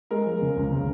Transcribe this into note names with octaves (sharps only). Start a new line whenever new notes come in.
G#3 A#4
F3
C#3
C#2
C#3